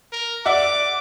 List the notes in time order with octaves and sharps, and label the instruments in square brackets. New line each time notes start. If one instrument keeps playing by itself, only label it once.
[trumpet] A#4
[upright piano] D5 E5 F#5 [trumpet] D6